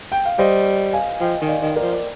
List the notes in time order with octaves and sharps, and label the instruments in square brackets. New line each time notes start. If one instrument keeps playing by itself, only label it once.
[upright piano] G5
F5
[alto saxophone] G3 [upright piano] C5 D#5
[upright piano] F5 G#5
[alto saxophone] F3 [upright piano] D#5 G5
[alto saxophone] D#3
[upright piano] D5 F5
[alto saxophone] D#3
[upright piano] A#4 D5
[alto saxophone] F3
[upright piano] D5